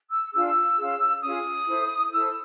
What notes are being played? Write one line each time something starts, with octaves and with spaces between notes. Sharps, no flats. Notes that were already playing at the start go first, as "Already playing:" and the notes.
E6
D4 F4 G#4 E6
C#4 F4 G#4
C#4 F4 G#4 D#6
E4 A4 C5
E4 A4 C5 E6